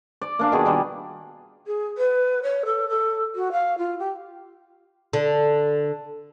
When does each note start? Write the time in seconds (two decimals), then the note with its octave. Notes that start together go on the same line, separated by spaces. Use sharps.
0.21 D5
0.39 A#3 D4 F5
0.52 B2 D#3 G#4
0.66 D#3 G3
1.67 G#4
1.97 B4
2.43 C#5
2.65 A4
2.89 A4
3.35 F#4
3.52 F5
3.78 F4
3.99 G4
5.13 D3